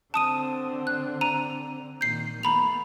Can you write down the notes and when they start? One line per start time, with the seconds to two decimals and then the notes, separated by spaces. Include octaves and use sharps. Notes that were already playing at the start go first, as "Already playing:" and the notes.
0.14 D3 C4 A5 D#6 D#7
0.87 F#6
1.21 A#5 D#7
2.01 A#2 D#3 G6 C7
2.43 A3 B3 A#5 B5 F7